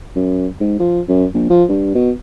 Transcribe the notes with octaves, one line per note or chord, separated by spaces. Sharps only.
F#2
G#2
F3
F#2
A#1
F3
G2
B2